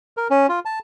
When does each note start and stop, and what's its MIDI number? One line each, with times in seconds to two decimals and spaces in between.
0.17 0.28 70
0.30 0.47 61
0.49 0.59 65
0.65 0.79 81